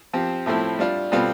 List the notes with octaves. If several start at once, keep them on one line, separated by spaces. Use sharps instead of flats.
F3 C4 G4
A2 F3 A3 C4 E4
G3 D4 F4
B2 G3 C4 F4 A4